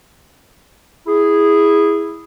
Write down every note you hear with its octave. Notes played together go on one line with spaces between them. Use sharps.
E4 G#4